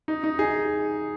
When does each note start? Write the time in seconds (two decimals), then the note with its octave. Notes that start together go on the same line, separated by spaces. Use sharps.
0.08 D#4
0.24 D#4
0.39 D#4 G#4